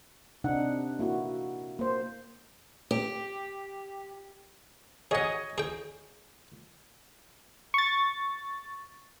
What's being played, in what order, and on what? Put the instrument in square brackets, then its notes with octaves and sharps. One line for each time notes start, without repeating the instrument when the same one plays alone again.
[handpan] C3 D4 D#4 F#5
A#3 E4 F#4
A#3 C5
[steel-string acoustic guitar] G4
[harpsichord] G#4 F#5 [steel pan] C#5 D#5 G#5
[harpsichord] G#4 G5
[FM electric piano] C#6 A6